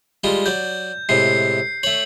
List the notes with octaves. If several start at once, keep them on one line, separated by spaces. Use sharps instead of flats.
G3 G#3 F4
F#3 D5 G6
A2 C3 G#3 C7
A3 C#5 F#7